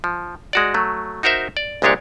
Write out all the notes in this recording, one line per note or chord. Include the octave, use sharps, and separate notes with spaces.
F3
G#3 F#4 D5
F#3 A3
D#4 F#4 A#4 C5 E5
D5
C2 A#2 G#3 D4 G4 C#5